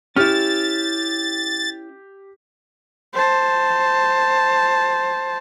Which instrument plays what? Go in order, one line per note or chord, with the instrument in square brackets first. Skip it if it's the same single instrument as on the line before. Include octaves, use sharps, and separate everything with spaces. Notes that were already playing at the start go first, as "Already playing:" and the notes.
[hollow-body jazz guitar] C#4 E4 [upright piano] G4 F6 [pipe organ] A6
[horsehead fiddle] C5 A5